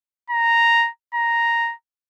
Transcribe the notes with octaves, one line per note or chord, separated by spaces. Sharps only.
A#5
A#5